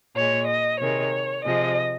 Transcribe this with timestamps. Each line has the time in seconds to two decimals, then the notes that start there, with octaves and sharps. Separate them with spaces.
0.16 A#2 G#3 C#5
0.47 D#5
0.80 C3 D#3 G#3 C#5
1.44 C3 F3 G#3 D#5